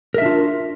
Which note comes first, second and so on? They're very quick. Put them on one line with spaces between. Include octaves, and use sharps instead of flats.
A#4 E5 D4 F4